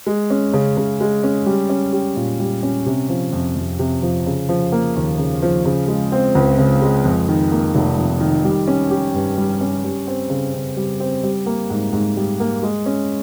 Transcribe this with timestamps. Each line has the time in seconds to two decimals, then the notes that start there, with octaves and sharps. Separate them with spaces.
0.07 G#3
0.30 C#4
0.53 C#3
0.77 C#3
1.01 G#3
1.24 C#4
1.46 G3
1.69 C#4
1.93 G4
2.16 A#2
2.40 G3
2.63 C#4
2.86 C3
3.09 F3
3.33 F2
3.56 F2
3.79 C3
4.02 F3
4.26 C#3
4.49 F3
4.72 A#3
4.96 D#2
5.18 C#3
5.42 F3
5.65 C#3
5.88 G#3
6.12 C4
6.35 C#2
6.58 C#3
6.82 G#3
7.05 F2
7.29 D#3
7.51 A#3
7.75 F1
7.98 F2
8.21 D#3
8.44 G3
8.67 C#4
8.91 G4
9.14 G2
9.38 G3
9.61 C#4
9.84 G3
10.07 C4
10.30 C#3
10.54 C#3
10.77 G3
11.00 C4
11.23 G3
11.46 A#3
11.70 G#2
11.93 G#2
12.17 G3
12.40 A#3
12.63 G#3
12.86 C#4